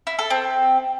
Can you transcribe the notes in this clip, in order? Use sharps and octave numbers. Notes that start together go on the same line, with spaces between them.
E4
A4
C4